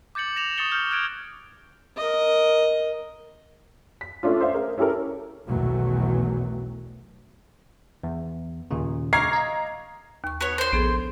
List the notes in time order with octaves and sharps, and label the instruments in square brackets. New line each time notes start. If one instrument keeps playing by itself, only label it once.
[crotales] D6 G6 A6 C#7 F#7
A#6 E7 F7
C#6 D#6 A6 C#7 G7
C#6 F6 G6
F6 F#6 G#6 D7
[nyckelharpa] A#4 D#5
[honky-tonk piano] B6
A3 C#4 D4 F4
C5 E5 F5
G#4 A#4
C#4 E4 G4 A4 A#4
[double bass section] B1 E2 B2 D#3 F#3 A3
[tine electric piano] E2
D#2 A#2 C#3
[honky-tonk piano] A#5 G#6 C7 [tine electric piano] C#6 D6 F6
[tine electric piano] D#5 F5
[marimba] D#2 C#6
[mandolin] B3 C#5 [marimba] F#4
[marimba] A#4 [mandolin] C5 C6
[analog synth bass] A#1 [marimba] B3 G#4 A4